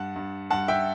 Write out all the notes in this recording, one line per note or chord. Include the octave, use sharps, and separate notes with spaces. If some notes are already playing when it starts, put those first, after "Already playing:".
Already playing: G2 F#5 A5
G2
G2 F#5 A5
E5 G5